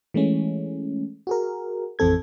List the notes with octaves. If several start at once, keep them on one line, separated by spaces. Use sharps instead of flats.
E3 G#3 A3 C#4
F#4 G#4 A#4
A1 F2 E3 C4 A4 G#6